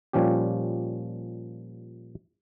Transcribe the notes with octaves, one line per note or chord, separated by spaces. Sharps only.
A#2 F3 G3 C#4 G4